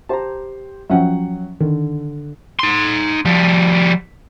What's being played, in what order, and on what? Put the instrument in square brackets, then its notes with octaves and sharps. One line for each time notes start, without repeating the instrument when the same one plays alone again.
[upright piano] G4 C5 [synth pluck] A5 A#5
[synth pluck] F3 C#4 E5 [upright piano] F#3 F#5 G5
[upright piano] D3 [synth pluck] D#3
[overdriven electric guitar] D#4 C6
F3 G3